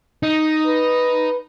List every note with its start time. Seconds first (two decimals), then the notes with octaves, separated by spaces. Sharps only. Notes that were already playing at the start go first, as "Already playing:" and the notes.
0.23 D#4
0.67 B4